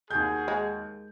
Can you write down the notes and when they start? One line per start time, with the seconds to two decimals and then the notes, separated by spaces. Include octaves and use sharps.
0.11 D#2 F#4 G#4 G6
0.48 G#3